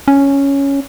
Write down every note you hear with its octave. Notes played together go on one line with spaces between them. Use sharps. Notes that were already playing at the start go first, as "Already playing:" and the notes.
C#4